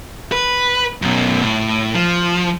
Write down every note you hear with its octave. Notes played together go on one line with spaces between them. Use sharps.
B4
F#2 B2
A2
F3